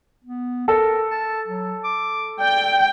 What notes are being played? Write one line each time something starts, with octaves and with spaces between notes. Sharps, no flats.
B3
A4 A#4
A5
F#3
D6
D5 G5